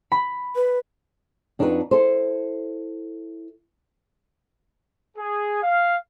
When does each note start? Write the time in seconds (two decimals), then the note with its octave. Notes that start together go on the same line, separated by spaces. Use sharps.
0.12 B5
0.56 B4
1.59 F2 D4 D#4 F#4 A4 B4
1.91 E4 A4 C5
5.17 G#4
5.63 F5